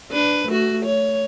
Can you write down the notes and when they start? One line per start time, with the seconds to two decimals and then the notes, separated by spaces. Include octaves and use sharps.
0.11 D4 B4
0.48 A3 F#4
0.85 C#5